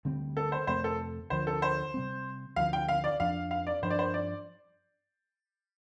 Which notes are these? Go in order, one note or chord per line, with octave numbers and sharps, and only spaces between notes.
D2 D3 G3 C4
A4
C5
F2 C3 A3 C4 C5
A4
D2 D3 F3 C5
A4
C5
C3 G3 C4
D2 D3 F3 F5
G5
F5
D5
F2 F3 D4 F5
F5
D5
G2 F3 D4 C5
D5
C5
D5